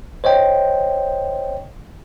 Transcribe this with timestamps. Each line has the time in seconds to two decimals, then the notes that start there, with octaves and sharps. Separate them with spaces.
0.24 C5 C#5 D#5 G5